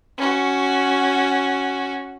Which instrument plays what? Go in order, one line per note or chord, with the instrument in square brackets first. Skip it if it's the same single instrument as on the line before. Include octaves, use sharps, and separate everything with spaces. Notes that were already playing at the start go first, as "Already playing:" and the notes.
[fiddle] C#4 F#4